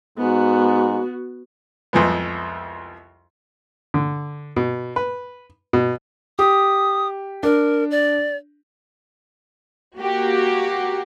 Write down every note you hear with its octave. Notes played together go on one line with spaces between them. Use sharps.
G#2 B3 F#4
C2 F2 F3 G#3 B3
D3
B2
B4
B2
G4 D#6
D4 A#4
D5
A#3 F#4 G4